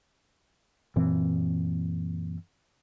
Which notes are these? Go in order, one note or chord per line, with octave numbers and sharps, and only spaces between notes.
F#2 A#2 E3 C4